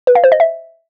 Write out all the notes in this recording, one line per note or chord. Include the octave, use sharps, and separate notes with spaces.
B4
F5
C5
D#5
E5